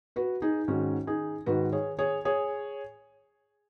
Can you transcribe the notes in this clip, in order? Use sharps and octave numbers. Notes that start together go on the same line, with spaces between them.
F#4 B4
D#4 G#4
G#2 D#3 C#4 F#4
D#4 G#4
G#2 D#3 F#4 B4
G#4 C#5
G#4 C#5
G#4 C#5